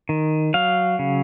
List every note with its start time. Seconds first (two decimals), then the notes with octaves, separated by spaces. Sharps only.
0.09 D#3
0.54 F#3 F5
0.99 C#3